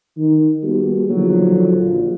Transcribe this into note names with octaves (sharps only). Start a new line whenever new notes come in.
D#3
G3 A#3 B3 F#4 G#4
D3 D#3 F3 F#3
A#1